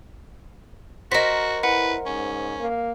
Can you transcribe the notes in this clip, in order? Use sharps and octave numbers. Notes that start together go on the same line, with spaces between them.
F#4 A#4 C5 D#5 B6
E4 B4 F#5
G#2 C#4
A#3